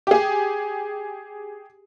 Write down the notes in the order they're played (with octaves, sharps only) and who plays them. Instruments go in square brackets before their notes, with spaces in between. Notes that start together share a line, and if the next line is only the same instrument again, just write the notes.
[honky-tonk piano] G4 G#4